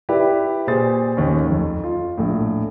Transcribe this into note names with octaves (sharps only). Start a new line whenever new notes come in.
E4 G4 B4 D5
A#2 G4 G#4 C5 A6
A1 D#2 C#4
F2
F4
A#1 A2